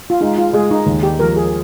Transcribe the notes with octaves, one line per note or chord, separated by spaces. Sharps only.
F4
G#3 D#4
F4
G#3 G#4
D#4
D#2
G4
F3 A#4
G#4